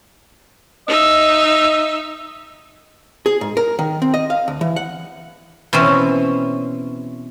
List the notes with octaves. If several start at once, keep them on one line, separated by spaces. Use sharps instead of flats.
D#4 D#5 E5
G#4
G#2
A#4
D#3
C4
D#5
F5
D2
E3
F#5
B2 E3 C4 C#4